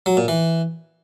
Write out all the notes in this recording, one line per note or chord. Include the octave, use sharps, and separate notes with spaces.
F#3
A#2
E3